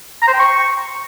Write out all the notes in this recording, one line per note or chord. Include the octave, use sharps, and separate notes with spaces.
A#5
C5
G5
C#6